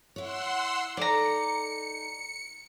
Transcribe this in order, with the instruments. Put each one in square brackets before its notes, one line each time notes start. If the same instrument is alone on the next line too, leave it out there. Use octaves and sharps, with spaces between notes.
[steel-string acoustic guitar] E4 C#5 [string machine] F#5 C6 E6
[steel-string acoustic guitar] D#4 A4 [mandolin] D5 A#5 [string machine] C#7